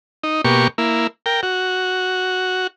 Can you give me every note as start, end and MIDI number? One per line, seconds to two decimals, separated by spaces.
0.23 0.41 63
0.45 0.68 47
0.45 0.68 58
0.45 0.68 67
0.45 0.68 85
0.78 1.07 58
0.78 1.07 64
1.26 1.41 70
1.26 1.41 79
1.43 2.67 66